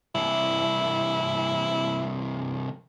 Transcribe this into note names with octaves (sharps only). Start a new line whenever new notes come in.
C2 E3 E4